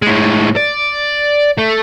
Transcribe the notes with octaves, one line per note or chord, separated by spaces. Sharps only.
A2 G#3
D5
A3